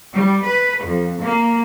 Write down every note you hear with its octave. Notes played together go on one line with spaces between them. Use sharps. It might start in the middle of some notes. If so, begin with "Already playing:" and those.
G3
B4
F2
A#3